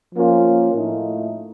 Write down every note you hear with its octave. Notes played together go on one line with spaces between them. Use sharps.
F3 A#3 C#4 F4
A2 A3 D#4